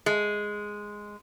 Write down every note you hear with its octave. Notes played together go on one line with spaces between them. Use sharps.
G#3